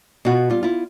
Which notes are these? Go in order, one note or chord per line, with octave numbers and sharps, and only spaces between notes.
B2 F4 F#4
G3 F4
E4 F4